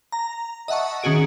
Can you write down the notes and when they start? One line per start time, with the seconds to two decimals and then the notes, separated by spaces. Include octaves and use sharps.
0.12 A#5
0.68 D#5 E5 F#5 A5 C#6
1.03 D#3 C#4 F#4 G#4 D7